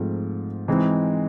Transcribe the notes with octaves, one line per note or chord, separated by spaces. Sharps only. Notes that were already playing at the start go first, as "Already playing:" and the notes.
Already playing: G#2 F3 A3 C4 F4
E3 G#3 C4 D#4